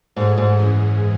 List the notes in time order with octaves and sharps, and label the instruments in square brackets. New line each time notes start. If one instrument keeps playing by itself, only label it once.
[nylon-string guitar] G#2 [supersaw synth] F#3 A3 D#4 G#4
[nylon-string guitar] G#2
[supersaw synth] F#2 E3 G#3 C#4 G#4